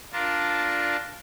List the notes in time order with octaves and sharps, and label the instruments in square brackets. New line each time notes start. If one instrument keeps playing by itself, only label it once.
[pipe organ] D4 F4 A#4 A5